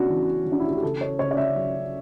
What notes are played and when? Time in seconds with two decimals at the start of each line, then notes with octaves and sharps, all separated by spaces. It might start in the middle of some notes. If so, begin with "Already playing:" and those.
Already playing: C#3 B3 C#4 D4 F#4
0.10 E3
0.46 E3
0.52 D4
0.60 E4
0.68 F#4
0.75 G4
0.83 C#3 A4
1.01 C#5
1.19 C#3 C#5
1.31 D5
1.37 E5
1.56 F#3